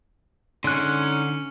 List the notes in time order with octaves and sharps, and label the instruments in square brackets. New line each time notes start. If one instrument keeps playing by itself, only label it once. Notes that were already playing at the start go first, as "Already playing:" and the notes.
[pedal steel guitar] D3 F#6 [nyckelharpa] C#4 [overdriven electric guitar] D#4 C6